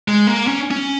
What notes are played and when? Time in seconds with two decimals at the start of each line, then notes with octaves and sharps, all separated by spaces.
0.08 G#3
0.27 A#3
0.47 C#4
0.71 C#4